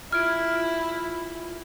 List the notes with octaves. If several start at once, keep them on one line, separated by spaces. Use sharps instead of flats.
E4 F4 F6 G#6 D7